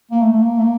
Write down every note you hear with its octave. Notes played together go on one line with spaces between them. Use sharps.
A#3
A3
A3
A#3
A3
A#3